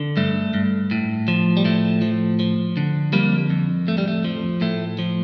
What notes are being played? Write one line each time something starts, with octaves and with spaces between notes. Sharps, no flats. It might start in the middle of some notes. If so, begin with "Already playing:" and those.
Already playing: D3
G2 A3
G2
A2
F3
G3
A2 A3
F3
F3
D3
F2 G3 A#3
F2
A2 A3
G3
A3
F3
A2 A3
F3